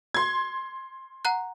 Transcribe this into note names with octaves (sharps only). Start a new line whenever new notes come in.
C6 G#6
F#5 A#5 F#6